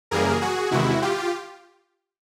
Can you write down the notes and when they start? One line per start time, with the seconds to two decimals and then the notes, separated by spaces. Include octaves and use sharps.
0.11 F#2 C#3 E3 G3 A#3 G#4 A#4
0.41 F#4 G#4
0.71 E2 C3 D#3 G#3 E4 F#4
1.02 F4 G4